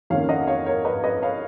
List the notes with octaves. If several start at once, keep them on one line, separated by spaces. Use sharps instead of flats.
F2 D#3 A#3 C#4 C#5 F5
D#5 F#5
C#5 F5
A#4 C#5
B4 D#5
B4 D#5
C#5 F5